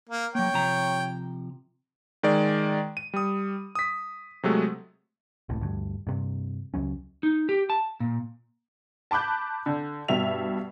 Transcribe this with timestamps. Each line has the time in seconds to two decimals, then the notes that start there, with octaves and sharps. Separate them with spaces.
0.09 A#3
0.35 F#3 A#3 C#5 G5
0.54 C3 F3 A#5
2.23 D#3 G#3 D5
2.97 D#7
3.14 G3 D#6
3.75 D#6 B6
4.43 C3 F#3 G#3 A3
5.49 F#1 C#2 A2 C3
5.61 D2 G2
6.07 G2 C3
6.74 C#2 F#3 C#4
7.23 D#4
7.49 G4
7.70 A5
8.00 A#2
9.11 A5 B5 D6 F#6 G6
9.66 D3
10.08 G2 B2 E5 F7